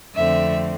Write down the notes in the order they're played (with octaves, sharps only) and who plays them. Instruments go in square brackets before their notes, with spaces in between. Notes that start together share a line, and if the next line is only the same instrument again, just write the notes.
[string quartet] F2 D3 A3 C4 E5